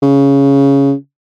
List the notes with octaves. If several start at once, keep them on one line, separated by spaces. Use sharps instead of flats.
C#3